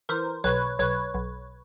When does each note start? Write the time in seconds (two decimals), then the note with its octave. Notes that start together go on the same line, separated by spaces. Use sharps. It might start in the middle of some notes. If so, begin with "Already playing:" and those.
0.09 E3 A#4 C5
0.44 B1 B4 C#5
0.79 B1 B4 C#5
1.14 B1